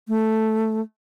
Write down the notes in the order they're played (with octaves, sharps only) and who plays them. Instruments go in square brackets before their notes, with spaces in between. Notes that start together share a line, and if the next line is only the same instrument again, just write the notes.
[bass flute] A3